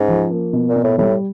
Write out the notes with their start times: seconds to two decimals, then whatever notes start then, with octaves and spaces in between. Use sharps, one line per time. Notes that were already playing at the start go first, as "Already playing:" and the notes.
Already playing: G#2 C#4
0.08 F3
0.31 A#3
0.53 B2
0.69 A#2
0.76 B2
0.84 A2
0.98 A2 G3